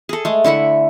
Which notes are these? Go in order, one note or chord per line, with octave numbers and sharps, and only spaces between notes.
G#4 A4
G#3 A3
D3 E4 E5 F#5